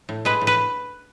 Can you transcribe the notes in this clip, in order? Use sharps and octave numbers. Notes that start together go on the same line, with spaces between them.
A2
G#3 B4
A2
B4